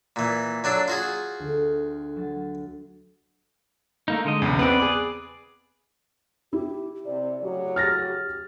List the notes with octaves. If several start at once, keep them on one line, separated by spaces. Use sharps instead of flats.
A#2 E3
F#3 D4 A4 E5 B5
F4 F#4 G#4
D2
F#3 A6
A3 A#3 D#4
D3 G#3 D#5
B1 E2 C#3
B3 C4 B4 D5
G#4 D6
E4 G4
C3 D5
A2 C#3 F#3 G4
F6 A6 A#6